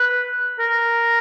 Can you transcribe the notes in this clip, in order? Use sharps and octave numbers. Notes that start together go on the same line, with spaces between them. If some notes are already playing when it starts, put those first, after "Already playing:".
Already playing: B4
A#4